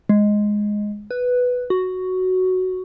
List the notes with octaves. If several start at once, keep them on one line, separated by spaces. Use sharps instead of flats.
G#3
B4
F#4